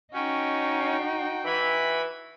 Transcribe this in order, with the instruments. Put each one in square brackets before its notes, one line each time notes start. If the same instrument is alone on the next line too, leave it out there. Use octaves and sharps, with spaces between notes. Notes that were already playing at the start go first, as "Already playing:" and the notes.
[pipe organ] C#4 [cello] D#4 [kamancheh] F#4 G5
[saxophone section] E3 [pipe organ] B5